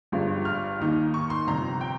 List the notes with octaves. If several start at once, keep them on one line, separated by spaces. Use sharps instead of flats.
G1 G2 F3 G#3
F6
D#2 D#3 A#3 D#4
C#6
C6
G1 F2 C3 A#5
G5